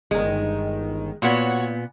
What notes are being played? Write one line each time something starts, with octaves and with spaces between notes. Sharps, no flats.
G1 D#3 G#3
A#2 B3 F#4 C#5